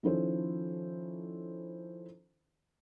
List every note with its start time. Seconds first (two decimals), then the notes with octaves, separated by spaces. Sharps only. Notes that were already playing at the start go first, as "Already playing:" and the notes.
0.03 D#3 F3 C#4 E4 A4 C5